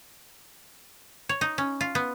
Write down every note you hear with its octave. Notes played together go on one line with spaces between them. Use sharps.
C#5
D#4
C#4
F4
B3